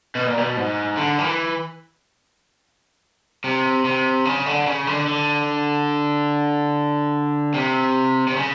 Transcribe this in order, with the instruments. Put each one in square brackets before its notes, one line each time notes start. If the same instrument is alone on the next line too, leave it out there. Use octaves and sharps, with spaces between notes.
[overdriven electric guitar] B2
A#2
B2
G#2
D3
D#3
E3
C3
C3
C#3
D3
C#3
D3
D3
C3
C3
C#3